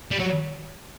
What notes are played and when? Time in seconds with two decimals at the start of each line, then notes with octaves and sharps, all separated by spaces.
0.11 G3
0.19 F#3